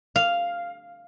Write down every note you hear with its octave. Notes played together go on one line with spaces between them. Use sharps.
F5